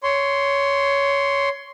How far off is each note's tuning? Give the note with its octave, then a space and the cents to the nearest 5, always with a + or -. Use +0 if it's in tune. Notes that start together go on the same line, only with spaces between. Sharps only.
C#5 +15 C6 +0